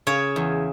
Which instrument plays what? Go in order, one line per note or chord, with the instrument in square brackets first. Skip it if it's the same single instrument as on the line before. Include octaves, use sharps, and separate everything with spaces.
[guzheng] C#3 C#5
E2